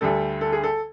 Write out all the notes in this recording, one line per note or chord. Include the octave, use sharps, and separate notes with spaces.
D2 D3 G3 A4
A4
G#4
A4